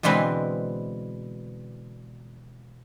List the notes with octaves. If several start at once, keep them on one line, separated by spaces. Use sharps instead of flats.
B2 D3 E3 G#3 C4 B4